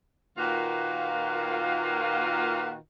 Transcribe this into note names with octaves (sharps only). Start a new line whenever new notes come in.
A#2 D#3 A#3 F4 F#4 B4